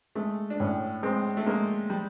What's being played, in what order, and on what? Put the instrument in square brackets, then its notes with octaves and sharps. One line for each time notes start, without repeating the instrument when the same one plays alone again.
[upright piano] G#3 [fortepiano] A3
[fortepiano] D4
[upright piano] A2 [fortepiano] C#4
[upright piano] G#3 [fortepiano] C4
[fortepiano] A3
[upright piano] G#3 [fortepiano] A#3
[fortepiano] G3